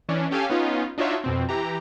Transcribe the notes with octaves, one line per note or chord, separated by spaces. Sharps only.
E3 C#4 D4
C#4 G4 A4 F5 G#5
B3 C#4 D#4 F4
D4 D#4 F4 F#4 C#5 E5
F2 B2 C4
E3 G4 A#5